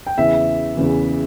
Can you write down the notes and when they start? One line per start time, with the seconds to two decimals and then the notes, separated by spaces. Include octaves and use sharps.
0.07 G5
0.17 E2 C#3 E3 E5
0.77 E2 C#3 E3